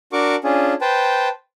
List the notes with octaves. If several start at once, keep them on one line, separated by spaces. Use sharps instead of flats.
D4 F#4 A#4 C#6 D6
C#4 D4 F4 G#4
B4 C5 G5 A5